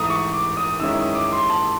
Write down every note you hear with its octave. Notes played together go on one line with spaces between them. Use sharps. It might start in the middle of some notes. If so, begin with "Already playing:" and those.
Already playing: G#2 E3 A3 D#6
C#6
D6
D#6
F#2 D#3 G#3 C#4 E4 E6
D#6
D6
C6
A5